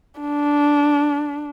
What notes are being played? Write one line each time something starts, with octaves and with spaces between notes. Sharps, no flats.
D4